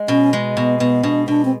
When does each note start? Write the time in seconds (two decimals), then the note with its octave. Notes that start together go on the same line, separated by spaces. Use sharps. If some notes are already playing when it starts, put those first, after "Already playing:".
Already playing: G#3
0.08 B2 C#4
0.33 G#3
0.56 B2 B3
0.79 B2 B3
1.03 B2 D4
1.28 B2 D4
1.45 C4